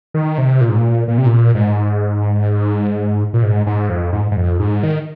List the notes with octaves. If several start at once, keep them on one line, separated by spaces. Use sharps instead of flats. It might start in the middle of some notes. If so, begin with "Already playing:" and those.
D#3
C3
A#2
G#2
A#2
A#2
C3
A#2
G#2
A#2
G#2
G#2
F2
G#2
G#2
F2
G#2
D#3